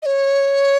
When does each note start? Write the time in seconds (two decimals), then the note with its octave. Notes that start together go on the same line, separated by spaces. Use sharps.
0.02 D#5
0.06 C#5